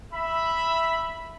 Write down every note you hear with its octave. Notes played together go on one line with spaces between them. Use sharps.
E5 B5